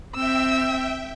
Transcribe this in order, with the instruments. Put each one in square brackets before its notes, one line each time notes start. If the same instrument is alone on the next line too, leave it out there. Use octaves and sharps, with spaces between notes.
[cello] C4 [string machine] E5 G5 [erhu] E6